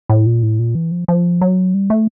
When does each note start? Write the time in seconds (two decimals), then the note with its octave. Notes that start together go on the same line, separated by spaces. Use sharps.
0.09 A2
0.26 A#2
0.43 A2
0.59 A#2
0.75 E3
0.91 F3
1.08 F3
1.41 F#3
1.74 G3
1.90 A3